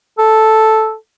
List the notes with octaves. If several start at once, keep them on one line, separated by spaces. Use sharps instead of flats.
A4